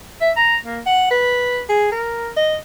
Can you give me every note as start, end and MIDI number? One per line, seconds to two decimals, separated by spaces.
0.21 0.31 76
0.36 0.55 82
0.65 0.80 58
0.86 1.10 78
1.11 1.63 71
1.69 1.91 68
1.91 2.30 70
2.37 2.55 75